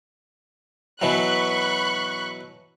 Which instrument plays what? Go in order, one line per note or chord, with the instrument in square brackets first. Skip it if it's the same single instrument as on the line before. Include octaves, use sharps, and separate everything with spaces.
[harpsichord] B2 E3 F#3 [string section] B5 C#6 F#6